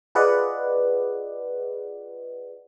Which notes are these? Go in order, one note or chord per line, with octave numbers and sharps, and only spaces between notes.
F4 G#4 B4 D5 D#5 F#5